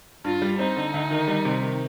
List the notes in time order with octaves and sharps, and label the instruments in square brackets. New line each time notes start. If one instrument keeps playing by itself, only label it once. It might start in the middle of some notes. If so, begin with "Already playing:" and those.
[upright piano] G2 [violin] F4
[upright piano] G3
[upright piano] C4 [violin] D#4
[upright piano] D3
D2
D#3
G3
C3
D#3